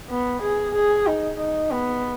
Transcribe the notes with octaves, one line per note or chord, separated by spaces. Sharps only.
B3
G#4
G#4
D#4
D#4
B3